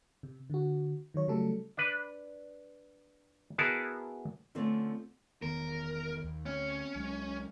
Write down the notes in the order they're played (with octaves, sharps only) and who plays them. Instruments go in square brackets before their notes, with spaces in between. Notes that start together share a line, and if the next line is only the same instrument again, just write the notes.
[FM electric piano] C3
D3 F#4
D#3 F#3 C#5
C#3 F#3 G3 A3 A4
[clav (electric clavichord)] D4 B4
B3 E4 F#4 G#4 A#4 A5
[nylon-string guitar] D3 F3 A3 C4 C#4
[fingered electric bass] E1 D#3 B3 [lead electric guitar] A#4
[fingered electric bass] D#2
[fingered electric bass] D2 C4 [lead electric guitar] C#4
[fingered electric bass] C2 F#3 G#3